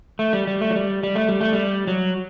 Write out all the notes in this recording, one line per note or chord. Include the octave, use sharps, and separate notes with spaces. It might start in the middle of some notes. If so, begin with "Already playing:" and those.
A3
G3
G3
A3
F#3
G3
G3
A3
G3
A3
G3
F#3